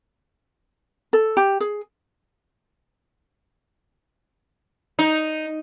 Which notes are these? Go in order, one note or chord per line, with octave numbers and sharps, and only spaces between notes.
A4
G4
G#4
D#4